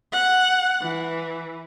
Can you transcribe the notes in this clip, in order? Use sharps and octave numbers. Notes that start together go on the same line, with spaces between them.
F#5
E3